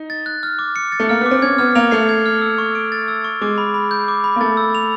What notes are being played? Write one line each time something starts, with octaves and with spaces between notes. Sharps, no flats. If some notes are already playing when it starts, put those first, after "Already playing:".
Already playing: D#4
A6
F#6
F6
D6
C#7
A6
A3
A#3 F6
B3 D6
C4
C#4 G#6
B3 F6
A#3 F7
A3 C7
G#6
F6
E6
C#6
D7
A6
E6
C#6
G#3 D6
B5
B5
G6
D6
B5
A#3
A3 A6
E6
F7